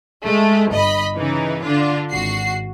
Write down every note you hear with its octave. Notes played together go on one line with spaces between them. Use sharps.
G#3 A3
G1 D#5 B5
C#3 E3 D#4
D3 D4 F4
G#1 F#4 C7